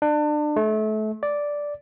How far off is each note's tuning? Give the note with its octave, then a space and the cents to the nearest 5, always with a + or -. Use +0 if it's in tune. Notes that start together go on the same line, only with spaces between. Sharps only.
D4 +30
A3 -30
D5 -5